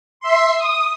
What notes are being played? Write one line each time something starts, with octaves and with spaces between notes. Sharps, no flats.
E5 C6
D#6